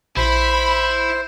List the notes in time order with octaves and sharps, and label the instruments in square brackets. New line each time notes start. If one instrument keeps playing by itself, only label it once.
[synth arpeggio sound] A#1 [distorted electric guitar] E4 [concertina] C5 [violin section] B5